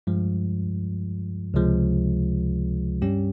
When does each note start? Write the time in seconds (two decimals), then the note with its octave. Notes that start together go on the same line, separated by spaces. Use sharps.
0.07 G2 F3 G#3
1.54 C#2 C3 F3 G#3
3.02 G2 G3 C#4 G4